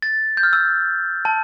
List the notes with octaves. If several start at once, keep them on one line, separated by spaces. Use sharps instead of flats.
A6
G6
F6
E6
A5